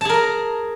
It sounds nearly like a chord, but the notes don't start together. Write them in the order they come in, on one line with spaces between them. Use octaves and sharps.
A5 G#4 A#4 A#5